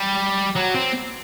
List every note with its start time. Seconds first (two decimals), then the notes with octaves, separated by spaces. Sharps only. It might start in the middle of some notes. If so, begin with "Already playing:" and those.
Already playing: G3
0.56 F#3
0.74 C4